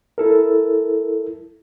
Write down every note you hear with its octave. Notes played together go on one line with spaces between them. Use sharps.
E4 A4 A#4